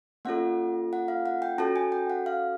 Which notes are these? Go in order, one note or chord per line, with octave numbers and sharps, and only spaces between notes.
A#3 C#4 F4 A4 F#5
F#5
F5
F#5
G5
C#4 F#4 A4 A5
G#5
G5
F#5
F5